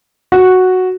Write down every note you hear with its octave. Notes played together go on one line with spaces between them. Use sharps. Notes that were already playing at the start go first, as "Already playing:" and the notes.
F#4